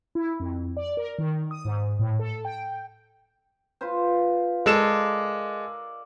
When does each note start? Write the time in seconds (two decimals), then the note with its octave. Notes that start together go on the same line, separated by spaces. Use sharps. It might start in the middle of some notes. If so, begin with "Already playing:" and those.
0.15 E4
0.40 F2
0.77 D5
0.97 A#4
1.18 D#3
1.51 D#6
1.65 G#2
1.99 A2
2.20 A4
2.45 G5
3.81 F4 B4 C5
4.66 G#3 A4 A#4 D5 F5 E7